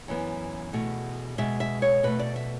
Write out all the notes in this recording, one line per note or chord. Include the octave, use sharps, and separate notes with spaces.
F#2 E3 B3
E2 B2 A3
B2 G#3 B3 E5
E5
C#5
B2 A3 B4
D5
E5